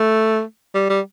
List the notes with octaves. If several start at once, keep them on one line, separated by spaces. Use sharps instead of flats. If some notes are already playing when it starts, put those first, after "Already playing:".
Already playing: A3
G3
G3